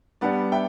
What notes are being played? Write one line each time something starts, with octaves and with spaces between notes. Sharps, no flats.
G3 B3 D4 G4 D5 F#5
E5 G5